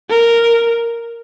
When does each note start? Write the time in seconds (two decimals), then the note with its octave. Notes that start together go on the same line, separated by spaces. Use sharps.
0.10 A#4